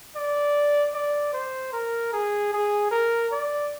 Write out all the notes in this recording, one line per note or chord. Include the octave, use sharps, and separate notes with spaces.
D5
D5
C5
A#4
G#4
G#4
A#4
D5